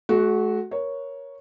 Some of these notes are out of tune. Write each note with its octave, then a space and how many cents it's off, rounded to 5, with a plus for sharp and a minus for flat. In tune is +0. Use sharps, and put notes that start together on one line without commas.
A3 -45 F#4 +5 F#5 +0
A#4 +15 C#5 +0